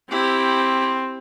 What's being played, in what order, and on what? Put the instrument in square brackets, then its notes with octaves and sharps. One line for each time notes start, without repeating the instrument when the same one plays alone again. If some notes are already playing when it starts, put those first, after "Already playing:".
[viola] C4 [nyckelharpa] E4 G4